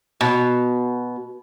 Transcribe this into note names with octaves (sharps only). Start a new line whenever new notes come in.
B2